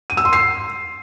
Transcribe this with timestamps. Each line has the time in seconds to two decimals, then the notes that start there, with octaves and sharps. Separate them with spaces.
0.10 D#7
0.17 E6
0.25 C6
0.33 C7